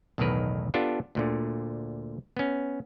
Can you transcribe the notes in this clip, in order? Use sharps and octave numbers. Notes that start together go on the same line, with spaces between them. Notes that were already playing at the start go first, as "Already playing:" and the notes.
B1 E2 A2 D#3 A#4 B4
B3 D4 F4 G4 A4
D2 A#2 D3
B3 C#4